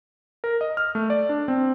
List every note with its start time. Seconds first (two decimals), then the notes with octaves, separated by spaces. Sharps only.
0.44 A#4
0.61 D#5
0.77 F6
0.95 A3
1.10 D5
1.29 D4
1.48 C4